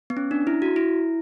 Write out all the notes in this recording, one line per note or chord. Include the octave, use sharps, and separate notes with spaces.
B3
C#4
D4
E4
F#4
E4